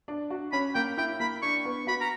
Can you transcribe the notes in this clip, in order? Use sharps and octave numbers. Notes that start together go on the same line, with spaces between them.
D4
F#4
C#4 B5
A#3 G5
E4 G5
A#3 B5
D4 C#6
B3
F#4 B5
A#5